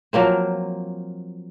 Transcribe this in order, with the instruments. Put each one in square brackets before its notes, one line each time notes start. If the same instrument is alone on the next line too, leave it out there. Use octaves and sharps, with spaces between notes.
[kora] F3 F#3 A#3 C4